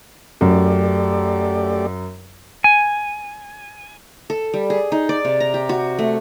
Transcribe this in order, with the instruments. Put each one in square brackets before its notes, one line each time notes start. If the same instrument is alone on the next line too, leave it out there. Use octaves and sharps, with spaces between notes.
[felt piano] F#2 [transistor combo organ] A3 G4 D5
[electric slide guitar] G#5
[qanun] A4
G3
G#4
D#4
D5
C3
A#5
G4
F#4
A3